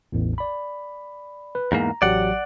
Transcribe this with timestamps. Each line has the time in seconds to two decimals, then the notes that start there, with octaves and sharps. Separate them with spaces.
0.12 A1 E2 A2
0.38 D5 B5
1.55 B4
1.72 E2 G#2 A#3 A#5
2.02 A1 F#3 G4 D5 F#5